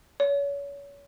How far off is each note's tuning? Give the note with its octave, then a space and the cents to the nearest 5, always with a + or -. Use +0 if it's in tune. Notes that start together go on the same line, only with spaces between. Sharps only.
C#5 +30